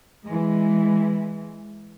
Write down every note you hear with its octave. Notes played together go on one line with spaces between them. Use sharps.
E3 G#3